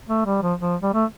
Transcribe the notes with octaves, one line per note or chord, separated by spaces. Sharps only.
A3
G3
F3
F3
G3
A3